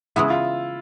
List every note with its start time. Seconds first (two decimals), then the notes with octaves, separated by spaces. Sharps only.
0.16 C#3 E3 G#3 B3 E4
0.30 F4